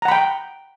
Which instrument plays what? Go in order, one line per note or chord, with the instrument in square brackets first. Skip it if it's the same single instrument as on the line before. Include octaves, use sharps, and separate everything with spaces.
[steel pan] A#5
F#5
B5
G5